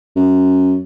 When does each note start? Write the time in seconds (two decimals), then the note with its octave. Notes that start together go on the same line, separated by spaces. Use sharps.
0.16 F#2